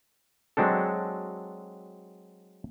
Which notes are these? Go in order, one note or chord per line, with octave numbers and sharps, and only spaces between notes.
F#3 G#3 C4 D4 A4